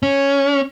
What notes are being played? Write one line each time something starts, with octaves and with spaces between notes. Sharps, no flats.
C#4